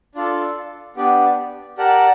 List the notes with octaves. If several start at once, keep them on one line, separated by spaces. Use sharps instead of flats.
D4 F4 A4
B3 D4 G4
G4 A#4 D5 F#5 A5